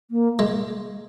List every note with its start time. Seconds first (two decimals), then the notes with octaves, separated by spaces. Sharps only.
0.11 A#3
0.39 G#3